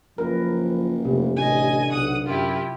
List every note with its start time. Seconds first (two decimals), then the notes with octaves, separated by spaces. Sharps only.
0.18 F#1 F3 A#4 B4
1.05 F1 C3
1.37 A1 D3 D#5 G#5
1.92 B1 F#5 D#6
2.26 F#2 E4 F4 G4